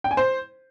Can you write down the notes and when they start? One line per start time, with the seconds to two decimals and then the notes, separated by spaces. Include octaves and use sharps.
0.04 G5
0.11 G#5
0.17 C5